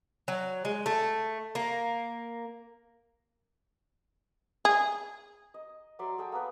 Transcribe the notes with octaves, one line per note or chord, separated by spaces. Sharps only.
F#3
G#3
A3
A#3
G#4
D#5
F#3 D5 E5 C6
G#4 A4 D5 G5
A#3 B3 B4